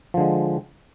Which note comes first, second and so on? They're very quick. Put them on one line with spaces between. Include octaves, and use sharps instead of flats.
F3 D3 G#3